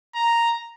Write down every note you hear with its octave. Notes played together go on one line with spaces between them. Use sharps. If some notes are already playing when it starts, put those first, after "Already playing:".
A#5